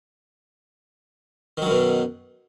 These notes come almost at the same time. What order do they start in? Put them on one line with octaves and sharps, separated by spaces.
D#3 F#3 F#2 B2